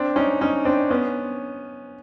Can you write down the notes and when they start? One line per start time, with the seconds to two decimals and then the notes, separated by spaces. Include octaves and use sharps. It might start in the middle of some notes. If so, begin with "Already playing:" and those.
Already playing: C4 D4
0.16 C#4 D#4
0.41 C#4 D#4
0.65 C4 D4
0.90 B3 C#4